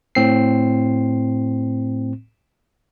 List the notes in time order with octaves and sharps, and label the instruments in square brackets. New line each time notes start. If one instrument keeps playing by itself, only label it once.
[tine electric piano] A2 C4 C7